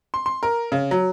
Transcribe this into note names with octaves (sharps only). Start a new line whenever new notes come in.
C6
C6
A#4
C#3
F#3